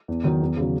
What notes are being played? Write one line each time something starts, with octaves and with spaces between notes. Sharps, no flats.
E2
D#3 F#3
E2
C#3 F#3